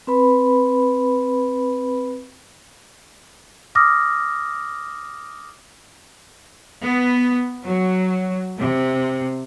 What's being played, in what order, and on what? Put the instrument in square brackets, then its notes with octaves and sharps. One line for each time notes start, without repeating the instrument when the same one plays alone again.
[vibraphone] C4 B4 B5
[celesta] D6 D#6 F6 A#6
[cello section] B3
F#3
C3